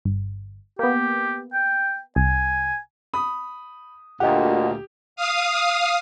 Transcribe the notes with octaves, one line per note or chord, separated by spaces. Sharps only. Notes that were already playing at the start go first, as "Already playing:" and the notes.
G1
A#3 B3 G4
G5
C2 G#5
B5 D#6
D2 A#2 G4 D#5 F#5
F5 D#6